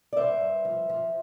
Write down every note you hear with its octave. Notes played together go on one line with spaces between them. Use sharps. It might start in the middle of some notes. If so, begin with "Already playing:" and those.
D5
G2 C5 E5
G2
F3
F3